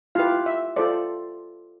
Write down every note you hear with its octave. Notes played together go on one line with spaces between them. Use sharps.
E4 F4 G4 B4 F5
E5
F4 A4 C5 D5